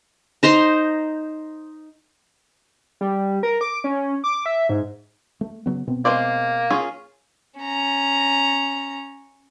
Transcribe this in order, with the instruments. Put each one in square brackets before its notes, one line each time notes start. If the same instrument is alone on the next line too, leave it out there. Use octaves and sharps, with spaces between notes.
[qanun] D#4 C5 A#5 C6
[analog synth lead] G3
A#4
D6
C#4
D6
E5
G#2
[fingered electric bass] A3
C#3 F#3 B3
B2 B3 C4
[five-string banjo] G#3 C5 D5 [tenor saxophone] A#3
[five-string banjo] C#4 F4 G#4
[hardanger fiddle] C#4 A#5